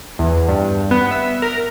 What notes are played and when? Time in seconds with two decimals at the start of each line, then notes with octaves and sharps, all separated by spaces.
0.19 E2
0.48 G2
0.91 B3
1.11 E5
1.42 A#4